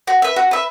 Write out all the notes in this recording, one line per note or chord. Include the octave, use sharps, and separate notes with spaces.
F#4
B4 E5
F#4
B4 E5